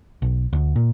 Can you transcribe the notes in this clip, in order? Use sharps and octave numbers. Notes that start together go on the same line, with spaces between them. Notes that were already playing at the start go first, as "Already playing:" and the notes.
B1
D2
A#2